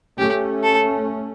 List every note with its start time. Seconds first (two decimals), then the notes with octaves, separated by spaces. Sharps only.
0.18 A3 C#4 G4
0.63 A4